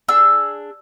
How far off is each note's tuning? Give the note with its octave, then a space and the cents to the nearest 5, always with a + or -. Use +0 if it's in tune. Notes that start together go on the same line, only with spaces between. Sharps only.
D4 +0 G#4 -5 E6 +0